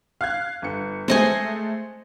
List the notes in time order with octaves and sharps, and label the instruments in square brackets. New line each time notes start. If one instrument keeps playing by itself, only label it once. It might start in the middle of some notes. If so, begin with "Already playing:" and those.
[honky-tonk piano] F5 F#6 G#6
G1 C#7
[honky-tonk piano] G#3 A3 C4 [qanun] C5 D#5 G#5